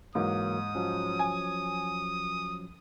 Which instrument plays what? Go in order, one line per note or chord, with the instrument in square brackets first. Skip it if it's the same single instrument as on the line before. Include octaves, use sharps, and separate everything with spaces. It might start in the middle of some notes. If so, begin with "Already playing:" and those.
[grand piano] G#2 [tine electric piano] E3 F#3 A#3 [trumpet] D#6
[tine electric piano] F3 F#3 C#4
[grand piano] G#5